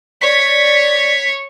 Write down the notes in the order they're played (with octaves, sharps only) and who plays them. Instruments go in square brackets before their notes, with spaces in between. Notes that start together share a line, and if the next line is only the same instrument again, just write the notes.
[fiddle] C#5 C#6 [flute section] D5 [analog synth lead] B6